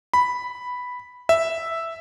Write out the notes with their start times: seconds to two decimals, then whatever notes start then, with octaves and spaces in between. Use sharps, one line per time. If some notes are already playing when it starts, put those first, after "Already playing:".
0.14 B5
1.29 E5